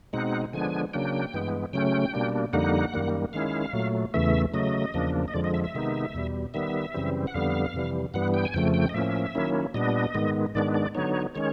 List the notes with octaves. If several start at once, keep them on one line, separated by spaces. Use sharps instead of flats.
B2 G#3 C4 D#4 F#5
D3 F3 G#3 B3 D4 G#5
C#3 F#3 A#3 D4 G5
G2 E3 G#3 B3
C#3 F#3 A3 C#4 G5
B2 G3 A#3 D4
F2 D3 G3 A#3 D#4 F#5
F#2 D#3 G3 A#3
D#3 G#3 C#4 E4 F5
A#2 F#3 A3
E2 C#3 E3 A3 E5
C#3 F#3 A3 D#5
E2 C#3 F3 A#3 D4
D#5
F2 D3 F3 G#3 D5
D#5
E5
E5
C3 D#3 G#3 B3 D#4
E2 B2 G3
D#3 G3 B3 E5
F#2 C#3 E3 G3 C4
F#5
F2 D3 G3 B3 F5
F2 C3 E3 G3
G2 E3 G3 B3 F#5
G5
G#5
F2 C#3 F3 A3 G5
G5
D#5
A2 F3 A#3 C#4 E5
D#3 F#3 A#3 C#4 E4
A#2 G3 B3 D4 D#5
G#2 D#3 G#3 B3
G#2 D#3 G#3 B3 D4 D5
D5
D3 F#3 B3 D#4 C#5
D#3 G#3 C#4 C#5